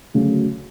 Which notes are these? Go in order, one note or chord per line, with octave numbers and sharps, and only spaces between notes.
D2 C#3 F#3